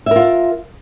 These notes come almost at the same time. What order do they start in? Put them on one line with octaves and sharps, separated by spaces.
E5 A#4 F4